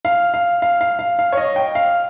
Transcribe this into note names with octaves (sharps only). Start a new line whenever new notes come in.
F5
F5
F5
F5
F5
F5
C#5
D#5
G5
F5